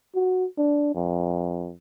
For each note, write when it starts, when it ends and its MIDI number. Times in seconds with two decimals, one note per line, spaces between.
0.15 0.45 66
0.58 0.91 62
0.95 1.73 41